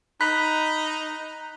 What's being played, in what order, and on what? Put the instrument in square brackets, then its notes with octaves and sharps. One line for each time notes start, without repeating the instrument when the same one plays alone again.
[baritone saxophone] D#4 [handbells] B5 F#6 B6